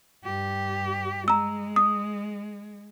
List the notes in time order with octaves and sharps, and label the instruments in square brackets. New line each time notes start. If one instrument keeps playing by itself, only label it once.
[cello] G2 G4
[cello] G#3 [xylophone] A#5 E6
[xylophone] D#6